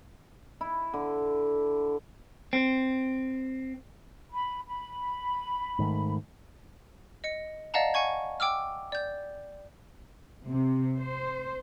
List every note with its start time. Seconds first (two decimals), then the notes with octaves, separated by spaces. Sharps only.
0.61 E4
0.93 D3
2.53 C4
4.31 B5
4.67 B5
5.79 G#2 D#3 A3
7.24 D#5 C#7
7.74 D5 D#5 F5 F#5 A5 A#5
7.94 F#5 G#5 C#6 G#6
8.40 G5 D6 E6 F6
8.92 D5 G6
10.48 C3
10.97 C5